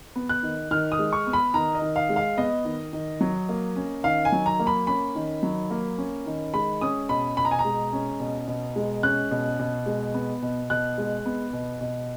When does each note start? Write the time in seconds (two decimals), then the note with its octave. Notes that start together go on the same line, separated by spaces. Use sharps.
0.16 B3
0.29 F#6
0.43 D#3
0.71 D#3 F6
0.92 D#6
0.99 G#3
1.13 C#6
1.27 B3
1.33 B5
1.54 D#3 A#5
1.75 D#5
1.82 D#3
1.96 F5
2.09 G#3
2.16 F5
2.37 B3 D#5
2.65 D#3
2.93 D#3
3.21 F#3
3.49 A#3
3.76 C#4
4.04 D#3 F5
4.25 G#5
4.32 F#3
4.46 A#5
4.59 A#3
4.67 B5
4.87 C#4 B5
5.15 D#3
5.43 F#3
5.70 A#3
5.98 C#4
6.26 D#3
6.54 G#3 B5
6.81 C#4 D#6
7.09 B2 B5
7.37 B2 B5
7.45 A#5
7.51 G#5
7.59 A#5
7.65 G#3
7.93 C#4
8.20 B2
8.48 B2
8.76 G#3
9.03 C#4 F#6
9.31 B2
9.59 B2
9.86 G#3
10.14 B3
10.42 B2
10.70 B2 F#6
10.98 G#3
11.26 B3
11.53 B2
11.81 B2